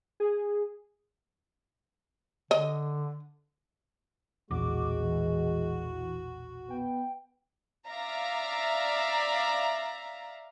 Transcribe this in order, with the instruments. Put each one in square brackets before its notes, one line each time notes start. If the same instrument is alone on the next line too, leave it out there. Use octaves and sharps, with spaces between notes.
[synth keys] G#4
[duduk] D3 [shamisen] D#5
[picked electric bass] E1 A#1 E2 [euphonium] G#3 [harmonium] F#4 [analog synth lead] D6
[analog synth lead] E3
[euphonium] B3 [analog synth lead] G5
[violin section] D5 E5 F5 A#5